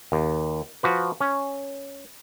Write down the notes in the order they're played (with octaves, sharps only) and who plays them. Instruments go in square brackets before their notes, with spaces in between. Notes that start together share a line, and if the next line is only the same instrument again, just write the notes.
[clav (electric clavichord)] D#2
F3 F#4 B4
C#4